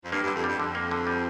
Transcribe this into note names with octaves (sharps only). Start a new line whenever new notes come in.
F2
G2 A#3
G2
D3
F2
G2 G3
F2 D3
A#3
D3
G3